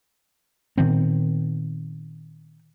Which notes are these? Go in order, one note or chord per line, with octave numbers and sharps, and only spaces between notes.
A#2 D#3 B3 C4